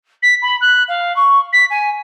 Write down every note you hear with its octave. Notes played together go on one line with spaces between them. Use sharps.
B6
B5
F#6
F5
C#6
B6
G#5